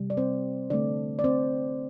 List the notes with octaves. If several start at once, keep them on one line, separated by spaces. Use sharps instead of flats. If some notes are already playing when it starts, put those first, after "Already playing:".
Already playing: C3 G3
D5
C4 C5
D3 A3 C4 D4 D5
D5
C4 C5